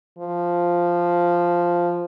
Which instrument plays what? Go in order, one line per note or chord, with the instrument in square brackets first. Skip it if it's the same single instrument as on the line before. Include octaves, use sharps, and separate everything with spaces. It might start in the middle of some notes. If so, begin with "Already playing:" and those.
[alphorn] F3